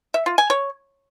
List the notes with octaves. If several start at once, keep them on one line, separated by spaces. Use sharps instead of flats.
E5
F4
G#5
C#5